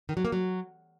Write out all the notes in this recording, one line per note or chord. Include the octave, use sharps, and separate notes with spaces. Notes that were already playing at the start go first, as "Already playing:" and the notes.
D#3
F#3
A#3
F#3